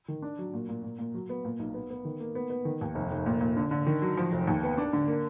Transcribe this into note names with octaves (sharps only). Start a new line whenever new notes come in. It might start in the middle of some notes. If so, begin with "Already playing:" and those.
D#3
D4
F#3
A#2
A#2
A#2
A#2
F#3
B3
A#2
B1
B3
B3
D#3
A#3
B3
B3
D#3
D#2
F1
F1
A#2
A#2
D3
D3
D#3
F#3
F3
F1
D#2
B3
D4
D3
A#3